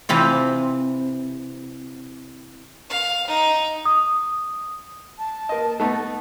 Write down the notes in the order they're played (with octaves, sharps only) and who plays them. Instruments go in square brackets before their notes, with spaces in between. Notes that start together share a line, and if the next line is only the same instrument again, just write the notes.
[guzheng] C3 E3 C4 F4
[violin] F5
D#4
[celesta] D#6
[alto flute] A5
[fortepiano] A#3 D#5
A3 B3 D#4